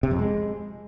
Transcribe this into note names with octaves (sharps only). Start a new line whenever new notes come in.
C3
F2
G#3